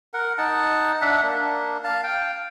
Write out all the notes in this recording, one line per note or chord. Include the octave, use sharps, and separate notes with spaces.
A#4 F#5
D#4 F#5 A5
D4 E5 F#5
A#3 D4
F5 A5
F5 G5